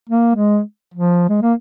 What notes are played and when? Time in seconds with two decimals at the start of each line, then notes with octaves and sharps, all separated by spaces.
0.10 A#3
0.35 G#3
0.94 F3
1.29 G#3
1.42 A#3